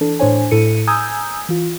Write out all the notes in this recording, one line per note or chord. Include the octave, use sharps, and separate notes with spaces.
E3 D4 A4
A2 D4 C5 C#5 G#5
A2 E4 A4 C#7 D#7
G#5 A#5 D#6 E6 G6 G#6
E3 F4